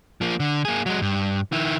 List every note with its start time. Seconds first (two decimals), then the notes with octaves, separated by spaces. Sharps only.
0.21 F3 A#3
0.40 D3
0.65 A#3 G#4
0.86 F#3 G#3
1.02 G2
1.52 D#3 E4